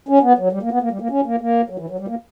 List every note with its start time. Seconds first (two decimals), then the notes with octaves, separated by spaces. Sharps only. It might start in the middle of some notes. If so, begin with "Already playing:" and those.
0.09 C#4
0.23 B3
0.38 F#3
0.52 G3
0.62 A#3
0.72 B3
0.82 A#3
0.91 G3
1.01 A#3
1.10 C#4
1.26 A#3
1.41 A#3
1.70 F#3
1.79 E3
1.90 F#3
1.99 G3
2.08 A#3